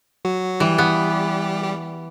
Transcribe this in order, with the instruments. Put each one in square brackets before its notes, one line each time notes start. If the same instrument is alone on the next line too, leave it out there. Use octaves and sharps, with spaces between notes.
[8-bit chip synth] F#3 F#4
[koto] E3 [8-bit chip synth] G3 G4
[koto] B3
[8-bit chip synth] G4